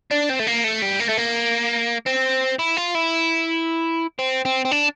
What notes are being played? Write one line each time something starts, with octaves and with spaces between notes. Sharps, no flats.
D4
C4
A3
A#3
A3
G3
A#3
A3
A#3
C4
E4
F4
E4
C4
C4
C4
D4